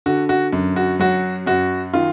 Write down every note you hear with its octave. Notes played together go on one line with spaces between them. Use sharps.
D3 F#4
F#4
F#2
F#4
F#3 F#4
F#2 F#4
D#3 F4